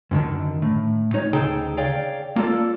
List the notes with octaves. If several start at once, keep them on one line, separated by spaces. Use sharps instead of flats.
F#2 B2 D3 D#3
A2
D#4 C#5
D2 C#3 D#4 G#4 A4 G5
G#4 C#5 D5 F5 G5
A#3 F4 A4 D5